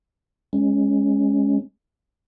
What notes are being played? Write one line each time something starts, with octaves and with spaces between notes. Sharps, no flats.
G#3 C#4